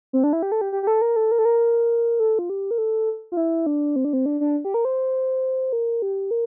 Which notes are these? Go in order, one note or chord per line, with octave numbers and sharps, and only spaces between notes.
C4
D4
E4
G4
A4
G4
G4
G4
A4
A#4
A4
A#4
A4
A#4
A4
F4
G4
A#4
A4
F4
E4
D4
C4
D4
C4
D4
D4
G4
A#4
C5
A#4
G4
A#4